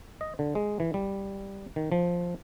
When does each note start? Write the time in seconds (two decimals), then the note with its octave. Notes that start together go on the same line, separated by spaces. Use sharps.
0.21 D#5
0.39 D3
0.55 G#3
0.80 E3
0.94 G3
1.76 D#3
1.92 F3